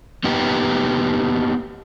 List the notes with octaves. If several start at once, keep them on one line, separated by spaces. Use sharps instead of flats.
A#3 B3 D#4 G4